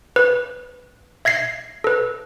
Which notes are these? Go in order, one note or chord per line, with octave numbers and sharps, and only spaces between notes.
B4
E5 G#6 A#6 C7
A4 B4